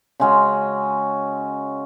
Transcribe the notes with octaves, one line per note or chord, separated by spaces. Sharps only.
C#3 G#3 C#4 F#4